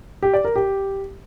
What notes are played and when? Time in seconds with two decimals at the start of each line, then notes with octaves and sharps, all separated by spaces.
0.22 G4
0.34 D5
0.45 A#4
0.56 G4